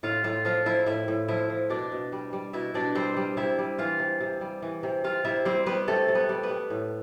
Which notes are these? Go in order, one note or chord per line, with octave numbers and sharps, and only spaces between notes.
A2 F4 F5
A2 F4 F5
F3 F4 F5
F3 E4 E5
A2 E4 E5
A2
F3 E4 E5
F3
B2 D4 D5
B2
G3
G3
B2 E4 E5
B2 D4 D5
G3 C4 C5
G3
C3 E4 E5
G3
E3 F4 F5
C3
C3
G3
E3
C3
C3 F4 F5
C3 E4 E5
G3 C4 C5
G3 B3 B4
C3 A3 A4
C3
B3 B4
G3
B3 B4
G3
A2